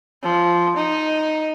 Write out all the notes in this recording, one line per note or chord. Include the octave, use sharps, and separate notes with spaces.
F3
D#4